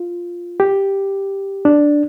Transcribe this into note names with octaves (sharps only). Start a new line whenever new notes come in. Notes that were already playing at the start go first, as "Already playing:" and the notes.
Already playing: F4
G4
D4